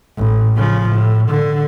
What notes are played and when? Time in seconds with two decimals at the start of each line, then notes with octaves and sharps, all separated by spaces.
0.17 A1
0.56 C#3 F3
0.89 A2
1.28 D3